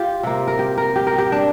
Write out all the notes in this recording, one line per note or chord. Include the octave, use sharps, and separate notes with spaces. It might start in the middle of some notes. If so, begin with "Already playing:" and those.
Already playing: F4 G4
C3 A#3
A#4
G4
A#4
G4
A#4
G4
D4